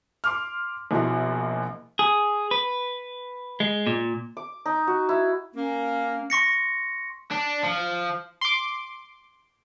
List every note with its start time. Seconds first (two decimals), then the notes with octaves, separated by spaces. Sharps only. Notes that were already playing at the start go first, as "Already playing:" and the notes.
0.24 C6 D6 F6
0.91 A#1 B2 A#3 E4 A#4 C6
1.99 G#4
2.51 B4
3.60 G#3
3.87 A#2
4.37 D6
4.66 D#4
4.87 F#4
5.09 E4
5.55 A#3 C#4
6.30 C6 C#6 A#6 C#7
7.31 D4
7.63 F3
8.41 C6 D6